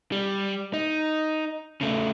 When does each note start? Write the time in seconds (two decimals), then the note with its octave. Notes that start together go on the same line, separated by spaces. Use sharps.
0.12 G3
0.74 D#4
1.81 C#3 A3